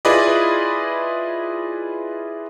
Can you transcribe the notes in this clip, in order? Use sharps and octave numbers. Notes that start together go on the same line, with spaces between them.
E4 F4 G#4 B4 D5 D#5